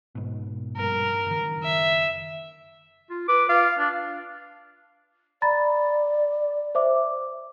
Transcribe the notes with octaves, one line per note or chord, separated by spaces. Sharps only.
G#2 B2
A#1 G2 A#4
F#1 D#3
E5
F4
B4 D6
F4 F5
D4
D5 A#5 B5 A6
C5 E5 D6